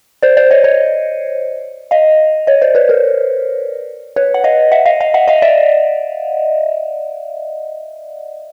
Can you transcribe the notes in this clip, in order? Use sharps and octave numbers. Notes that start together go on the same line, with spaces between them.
C5 D5
C5 D5
C#5 D#5
C#5 D#5
D#5 F5
C#5 D#5
C5 D5
B4 C#5
A#4 C5
B4 C#5
F#5
D#5 F5
E5 F#5
D#5 F5
D#5 F5
E5 F#5
D#5 F5
D5 E5